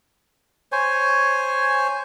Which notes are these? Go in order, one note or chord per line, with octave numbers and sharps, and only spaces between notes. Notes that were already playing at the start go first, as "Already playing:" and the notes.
C5 C#5 G#5